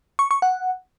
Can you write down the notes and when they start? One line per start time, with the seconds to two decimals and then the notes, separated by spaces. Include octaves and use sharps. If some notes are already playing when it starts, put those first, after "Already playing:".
0.19 C#6
0.31 C#6
0.42 F#5